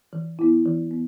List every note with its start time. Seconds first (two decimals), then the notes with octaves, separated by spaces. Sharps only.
0.13 E3
0.39 B3 E4
0.66 E3
0.91 B3